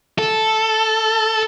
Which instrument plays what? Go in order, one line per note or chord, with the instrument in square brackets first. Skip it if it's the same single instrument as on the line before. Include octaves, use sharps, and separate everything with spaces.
[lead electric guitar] A4